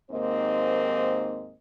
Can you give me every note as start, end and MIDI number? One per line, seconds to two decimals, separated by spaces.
0.11 1.55 39
0.11 1.55 44
0.11 1.55 58
0.11 1.55 60
0.11 1.55 72
0.11 1.55 75